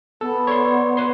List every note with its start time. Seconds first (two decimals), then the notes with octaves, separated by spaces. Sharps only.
0.21 B3 A4
0.47 C#5 D5 C6
0.97 B4 C#5 C6